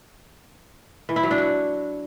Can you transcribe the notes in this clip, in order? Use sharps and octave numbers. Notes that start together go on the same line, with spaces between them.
E3
E4
F#3
D4
F#4